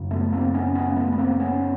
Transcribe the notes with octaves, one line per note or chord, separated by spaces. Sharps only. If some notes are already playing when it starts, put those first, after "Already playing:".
Already playing: F#2 C#3
A3 B3
A#3 C4
B3 C#4
B3 C#4
A#3
A3 B3
B3
A#3 C4
B3 C#4